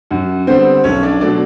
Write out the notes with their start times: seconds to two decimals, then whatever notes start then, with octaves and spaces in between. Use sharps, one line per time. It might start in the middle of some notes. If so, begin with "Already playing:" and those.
0.11 F#2 F#4
0.47 D3 G3 B3 C4 C5
0.84 B1 C#4 C#5
1.03 D4 D5
1.21 B2 F#3 A3 D4 D5